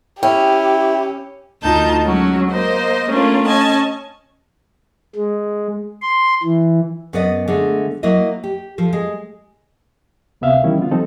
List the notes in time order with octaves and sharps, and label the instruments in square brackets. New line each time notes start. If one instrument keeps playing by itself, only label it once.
[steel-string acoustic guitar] C#4 [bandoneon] E4 [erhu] G4 [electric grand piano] G5
[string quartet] D2 D#4 F4 A5 G6
F#3 G#3 C#4 F#4
A#3 C5 D#5
A3 A#3 C#4 D4 F4
C#4 D#5 G#5 A5
[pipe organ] G#3
C6
E3
[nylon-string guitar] F#2 B3 B4 D5 D#5
D3 G#3 A3
F#3 A#3 E4 D#5
G4
F3 A4
G#3
[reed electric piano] D2 C3 B3 E5 F5
D#3 E3 G3 C#4 E4
D3 B3 F4
F3 G3 C4 D#4 A4